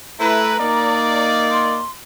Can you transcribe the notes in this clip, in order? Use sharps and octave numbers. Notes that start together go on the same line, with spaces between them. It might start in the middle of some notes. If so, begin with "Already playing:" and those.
A3 E4 B4 A#5
A#3 D#4 D5
C6